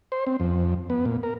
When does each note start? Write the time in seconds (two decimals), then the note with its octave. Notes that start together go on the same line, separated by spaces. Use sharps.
0.12 C5
0.27 C4
0.40 F2
0.90 B3
1.06 A#2
1.23 A#4